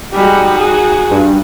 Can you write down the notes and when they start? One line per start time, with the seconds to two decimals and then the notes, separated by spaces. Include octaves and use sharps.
0.13 G3 G#3 D#4 F#4
0.55 G#4
1.11 G2